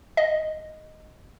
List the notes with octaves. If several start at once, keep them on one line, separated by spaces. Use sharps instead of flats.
D#5